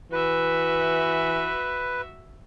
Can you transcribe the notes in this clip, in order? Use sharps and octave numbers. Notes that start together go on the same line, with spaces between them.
E3 F#4 B4 E5